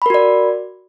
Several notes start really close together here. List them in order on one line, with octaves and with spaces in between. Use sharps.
B5 A#4 F#4 D5